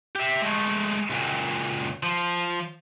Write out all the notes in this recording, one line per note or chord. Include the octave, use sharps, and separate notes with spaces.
G4 E5
G#3 A3
C#2 A#2
F3